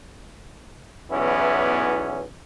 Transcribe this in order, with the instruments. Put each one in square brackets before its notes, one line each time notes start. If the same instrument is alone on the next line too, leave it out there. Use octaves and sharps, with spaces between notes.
[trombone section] B1 E2 E3 B3 C#4 E4